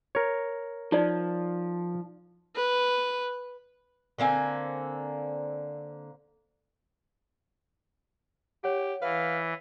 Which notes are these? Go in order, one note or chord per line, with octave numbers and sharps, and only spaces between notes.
A#4 C#5
F3 D#4 D5
B4
D3 A#3 C4 G#5
G4 C#5 F#5
E3 B4 F5